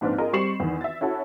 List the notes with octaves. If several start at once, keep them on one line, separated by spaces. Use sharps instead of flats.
A#1 G#2 C4 D4 B4 F6
F4 G#4 A#4 D#5
G3 C4 C#6 C7 E7 F#7
E2 D#3
E5 A6
C#4 E4 F#4 A4 A5